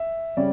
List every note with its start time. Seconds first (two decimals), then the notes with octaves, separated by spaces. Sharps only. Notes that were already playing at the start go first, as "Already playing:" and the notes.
Already playing: E5
0.37 C#3 G3 C#4 D5